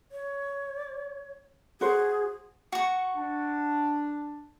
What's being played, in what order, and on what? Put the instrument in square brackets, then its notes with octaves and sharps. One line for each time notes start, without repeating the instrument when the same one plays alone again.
[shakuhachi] C#5
[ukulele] F#4 C5 [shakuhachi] G#4
[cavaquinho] F#4 C#6
[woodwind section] D4